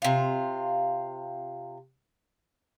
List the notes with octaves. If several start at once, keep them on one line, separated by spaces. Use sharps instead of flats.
C3 F4